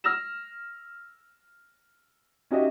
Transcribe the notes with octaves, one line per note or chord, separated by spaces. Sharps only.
E6 F6 A#6 E7
C#4 D#4 F#4 G4 D#5 E5